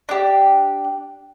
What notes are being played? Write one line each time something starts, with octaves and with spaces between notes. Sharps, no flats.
D4 G4